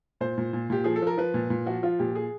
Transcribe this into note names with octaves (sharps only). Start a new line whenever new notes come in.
A#2 C5
A#2
A#2
A#2 G4
F3 G#4
A4
F3 A#4
F3 B4
A#2
A#2
F3 F#4
F3 F4
A#2 G4
G#4